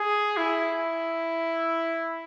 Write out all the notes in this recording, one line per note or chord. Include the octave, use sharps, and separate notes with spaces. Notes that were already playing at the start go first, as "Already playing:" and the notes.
Already playing: G#4
E4